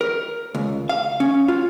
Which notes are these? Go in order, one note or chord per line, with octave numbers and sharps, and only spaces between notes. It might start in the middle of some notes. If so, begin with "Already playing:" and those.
A#4
C#2
F5
C#4
F4